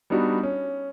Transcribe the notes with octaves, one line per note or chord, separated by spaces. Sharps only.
G3 B3 D4 D#4 F#4
C#4